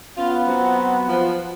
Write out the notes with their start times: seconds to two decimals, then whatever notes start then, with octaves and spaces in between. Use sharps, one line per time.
0.17 B3 C#4 F4
0.47 F#3 C4 F#4
1.08 F3